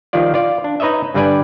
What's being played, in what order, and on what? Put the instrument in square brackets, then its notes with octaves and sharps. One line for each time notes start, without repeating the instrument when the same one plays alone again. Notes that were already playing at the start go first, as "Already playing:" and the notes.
[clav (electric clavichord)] D#3 F3 G3 F4 D5
F4 D5
D4
D#4 B4 C#5 D#5 E5
G2 D3 G3 B4 D5 G#5